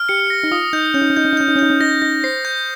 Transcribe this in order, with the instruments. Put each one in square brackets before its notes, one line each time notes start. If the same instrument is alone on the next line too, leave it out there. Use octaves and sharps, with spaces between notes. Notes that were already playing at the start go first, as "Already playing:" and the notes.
Already playing: [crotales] F6
[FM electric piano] G4 [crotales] C#7
[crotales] A#6
[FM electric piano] D#4
[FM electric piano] F4 [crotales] D#6
[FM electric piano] D#4 [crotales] G6
[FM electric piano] C#4 [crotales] G6
[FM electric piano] D#4
C#4
[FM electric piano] D#4 [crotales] G6
[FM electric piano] C#4
D#4
[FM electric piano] C#4 [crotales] G6
[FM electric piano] D#4
C#4
[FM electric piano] D#4 [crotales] G6
[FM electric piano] C#4
[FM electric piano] D#4 [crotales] A#6
[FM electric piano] D#4 [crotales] A#6
[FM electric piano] C5 [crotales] C7
[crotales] G6